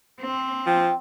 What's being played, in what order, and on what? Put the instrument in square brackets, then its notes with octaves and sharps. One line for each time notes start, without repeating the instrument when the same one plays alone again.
[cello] C4
[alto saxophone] F3 [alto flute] G5